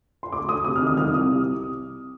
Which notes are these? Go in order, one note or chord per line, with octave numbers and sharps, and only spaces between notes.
C6
D2 D6
D2 D#6
C3 D#6
F6
D#3
D#6
C2 F6
C2 D#6
C3